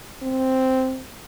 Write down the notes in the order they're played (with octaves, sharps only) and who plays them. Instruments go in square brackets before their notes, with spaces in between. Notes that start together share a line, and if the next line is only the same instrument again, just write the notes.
[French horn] C4